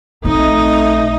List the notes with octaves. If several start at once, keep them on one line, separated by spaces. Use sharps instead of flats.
A#1 A3 C4 D#4 D#5